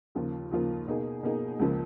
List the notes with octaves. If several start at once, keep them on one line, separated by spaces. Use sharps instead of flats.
D#2 C#3 F3 A#3 F4
D#2 C#3 F3 A#3 F4
B2 A#3 D#4 G#4
B2 A#3 D#4 G#4
C#2 C#3 F3 A#3